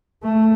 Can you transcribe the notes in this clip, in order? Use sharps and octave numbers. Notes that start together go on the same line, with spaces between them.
A3